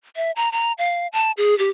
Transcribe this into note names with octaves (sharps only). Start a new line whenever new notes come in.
E5
A#5
A#5
F5
A5
G#4
G4